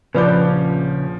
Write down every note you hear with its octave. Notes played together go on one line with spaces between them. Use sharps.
A#1 C#3 F3 C#4 B4 D5 G6